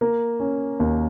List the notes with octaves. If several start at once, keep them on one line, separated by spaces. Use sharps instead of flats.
A#3
C#4
D#2